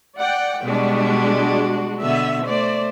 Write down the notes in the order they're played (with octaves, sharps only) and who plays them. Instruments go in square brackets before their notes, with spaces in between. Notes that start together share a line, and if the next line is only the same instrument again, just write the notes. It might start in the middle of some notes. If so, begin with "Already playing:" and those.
[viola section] D5 F#5 G5
[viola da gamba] B2 G3 [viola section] G#3 D4 F#4
[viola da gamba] B2 D3 B3 [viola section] E5
[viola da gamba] A3 C5 [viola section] D5